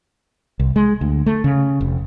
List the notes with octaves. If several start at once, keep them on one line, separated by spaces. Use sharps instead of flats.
C2
G#3
D2
A3
C#3
F1